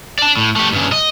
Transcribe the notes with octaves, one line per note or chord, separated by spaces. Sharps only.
D5 A5
A2
A3 G4
G2 C#3
D#5